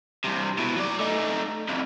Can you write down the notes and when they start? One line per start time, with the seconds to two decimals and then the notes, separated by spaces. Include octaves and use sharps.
0.25 G2 C3
0.59 B2 E3
0.77 F#3 D5
1.00 A3 D#4
1.68 C2 F2